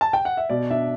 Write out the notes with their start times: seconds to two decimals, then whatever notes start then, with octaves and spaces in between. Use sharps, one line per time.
0.01 A5
0.13 G5
0.25 F#5
0.37 E5
0.50 B2 D5
0.70 D4 E5